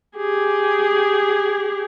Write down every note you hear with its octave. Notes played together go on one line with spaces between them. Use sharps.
G4 G#4